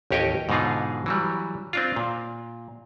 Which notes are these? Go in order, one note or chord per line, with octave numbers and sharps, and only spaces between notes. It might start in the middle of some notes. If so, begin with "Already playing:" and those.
A1 D#2 G4 C#5 D#5 G5
G#2 B2 D3 D#4 F4 G#4
E3 F#3 G3
C4 D4 F4
A#2